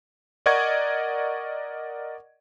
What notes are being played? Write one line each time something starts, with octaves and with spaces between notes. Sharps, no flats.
A#4 D5 D#5 F#5 C#6 G#6